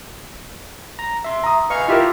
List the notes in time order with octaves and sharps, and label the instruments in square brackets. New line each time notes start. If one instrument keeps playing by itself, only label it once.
[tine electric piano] A#5
E5 C6
[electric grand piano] A#5 D#6
[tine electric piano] B4 D#5 G#5 [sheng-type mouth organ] F5 C#6
[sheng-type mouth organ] E4 G4 E5 [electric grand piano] F4 A#4 [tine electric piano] F6